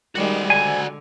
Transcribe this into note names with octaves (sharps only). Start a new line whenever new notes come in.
D#3 G3 G#3 F#4 D5
D3 G#5